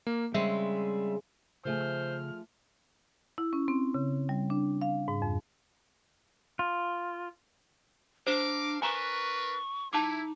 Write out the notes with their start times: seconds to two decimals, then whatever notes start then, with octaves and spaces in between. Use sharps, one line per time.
0.07 A#3
0.34 C#3 G3 G#3 C4 E5
1.65 C#3 F3 A3 G#4 C5 F6
3.38 E4
3.53 C#4
3.68 C4
3.94 C#3
4.29 G3
4.50 D4
4.81 F5
5.08 G#2
5.22 F2
6.59 F4
8.27 D4 C5 F5 A#5 D6
8.82 D4 A#4 B4 G#5 A#5 C#6
9.93 D#4 E4 A5 D6